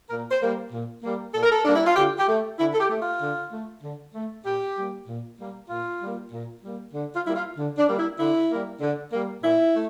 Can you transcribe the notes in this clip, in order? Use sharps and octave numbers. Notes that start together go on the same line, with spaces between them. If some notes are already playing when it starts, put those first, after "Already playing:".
A#2 A#4
C5
G3 A#3
A#2
G3 A#3
A#2 A4
A#4
A4
G3 A#3 D4
E4
F4
D3 G4
G4
A3
D3 E4
A4
G4
A3
F4
D3
A3
D3
A3
A#2 G4
G3 A#3
A#2
G3 A#3
A#2 F4
G3
A#3
A#2
G3 A#3
D3
F4
G3 A#3 E4
F4
D3
D4
G3 A#3
E4
D3 E4
G3 A#3
D3
G3 A#3
A#2 E4
A3